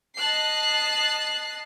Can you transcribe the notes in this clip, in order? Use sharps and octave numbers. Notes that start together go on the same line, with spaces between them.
D#5 A5 F#6 C7